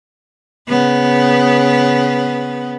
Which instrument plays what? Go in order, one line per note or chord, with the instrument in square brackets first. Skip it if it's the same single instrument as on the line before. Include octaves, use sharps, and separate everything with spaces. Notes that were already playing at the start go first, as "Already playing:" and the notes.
[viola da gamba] C#3 B3